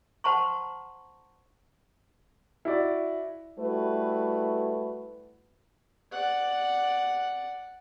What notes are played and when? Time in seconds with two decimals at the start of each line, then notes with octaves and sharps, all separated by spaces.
0.24 C5 F#5 A5 A#5 C6 C#6
2.65 E4 F#4 D5
3.58 G3 A3 E4 F#4 B4
6.12 D5 F#5